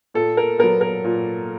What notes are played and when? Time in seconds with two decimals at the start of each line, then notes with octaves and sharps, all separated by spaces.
0.14 A#2 A4
0.37 A#4
0.59 F#3 B3 A#4
0.81 A#4
1.04 A#2